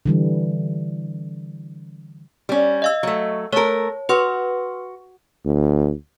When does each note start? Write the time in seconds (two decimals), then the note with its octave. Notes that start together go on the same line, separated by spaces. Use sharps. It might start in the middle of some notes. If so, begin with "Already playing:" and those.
0.05 D3 E3 G3
2.49 G3 C#4
2.82 D#5 F5 E6
3.03 F#3 A3
3.52 A3 A#4 C#5 A5
4.09 F#4 B4 C6 F6
5.45 D2